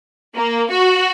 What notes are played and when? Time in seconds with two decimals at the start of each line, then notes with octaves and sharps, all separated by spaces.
0.35 A#3
0.69 F#4